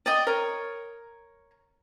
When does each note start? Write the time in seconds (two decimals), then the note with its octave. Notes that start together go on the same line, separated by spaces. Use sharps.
0.06 D5 D#5 G5 D#6
0.27 A#4 C#5